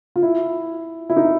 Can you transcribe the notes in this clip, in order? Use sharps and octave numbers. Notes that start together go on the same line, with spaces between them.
F4
E4
E4
D#4